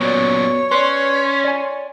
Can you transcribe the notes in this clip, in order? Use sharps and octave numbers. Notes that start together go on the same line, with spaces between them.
F#2 A#2 B3 F#4 C#5 D5
C#4 B4 D5 C6
D5 G#5